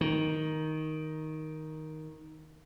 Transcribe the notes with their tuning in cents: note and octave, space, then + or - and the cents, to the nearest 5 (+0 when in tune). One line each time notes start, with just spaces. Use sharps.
D#3 +5